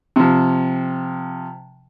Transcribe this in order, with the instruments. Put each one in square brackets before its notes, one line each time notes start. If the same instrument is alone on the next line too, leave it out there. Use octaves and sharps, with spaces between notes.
[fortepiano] C3 F3